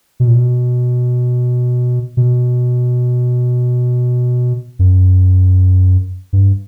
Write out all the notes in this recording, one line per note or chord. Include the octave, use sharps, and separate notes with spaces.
B2
A#2
B2
B2
F#2
G2